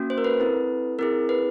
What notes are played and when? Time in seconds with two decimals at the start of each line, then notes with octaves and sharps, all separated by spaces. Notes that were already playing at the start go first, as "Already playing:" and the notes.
Already playing: A#3 C#4 F#4
0.10 C5
0.18 A#4
0.24 B4
0.40 C4 E4 A4
0.99 C4 E4 G#4 A#4
1.29 B4